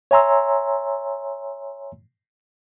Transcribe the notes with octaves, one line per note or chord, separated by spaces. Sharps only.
C#5 E5 G#5 A#5 C6 E6